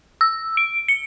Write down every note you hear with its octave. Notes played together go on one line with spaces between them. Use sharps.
E6
D7
C#7